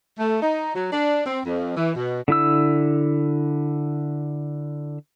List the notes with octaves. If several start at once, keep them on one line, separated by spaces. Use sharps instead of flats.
A3
D#4
F#3
D4
C4
F2
E3
B2
D3 E4 E6